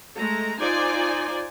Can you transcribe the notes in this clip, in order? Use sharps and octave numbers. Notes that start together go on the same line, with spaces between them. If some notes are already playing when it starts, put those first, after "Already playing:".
G#3 A3 A#5
D#4 F4 C5 D5 G#5